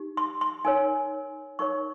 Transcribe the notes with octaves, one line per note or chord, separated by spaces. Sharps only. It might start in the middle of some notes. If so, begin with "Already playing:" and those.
Already playing: D#4 G4
C6
C6
D#4 A#4 C#5 G#5
D#4 A#4 C#5 C#6